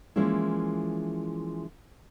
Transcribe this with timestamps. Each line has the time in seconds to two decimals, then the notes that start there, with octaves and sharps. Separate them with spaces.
0.16 E3 F3 G#3 A#3 C#4 E4